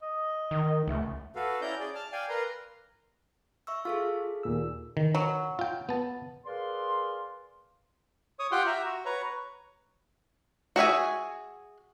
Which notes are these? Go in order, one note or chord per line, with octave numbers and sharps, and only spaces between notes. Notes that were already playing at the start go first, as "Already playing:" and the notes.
D#5
D#3
C#2 A3
F#4 A4 B4 F5
C#4 E4 D5 A#5 G6
G#4 D5
A5 F6
D5 F5 G5 G#5
A#4 B4 A#5 C6
E5 C#6 E6
F4 G#4 A4 F5
D#2 A#2 E6
D#3
F#3
F4 G5
B3 A5
G#4 A#4 B4 D5 F5 C6
C#5 D#6
F4 G4 F#5 G5 C6
E5 A#5
F#4
B4 C#5 A#5
F#4 G#4 E5 G#5